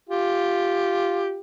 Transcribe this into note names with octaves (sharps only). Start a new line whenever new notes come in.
F4 G4